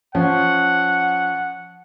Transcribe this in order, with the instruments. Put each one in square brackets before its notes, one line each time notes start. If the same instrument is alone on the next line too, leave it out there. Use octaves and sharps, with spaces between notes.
[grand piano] F3 C#4 [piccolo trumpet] F#5